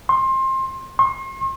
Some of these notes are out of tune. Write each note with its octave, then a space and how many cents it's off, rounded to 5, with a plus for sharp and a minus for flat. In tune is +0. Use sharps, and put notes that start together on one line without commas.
C6 +25
C6 +45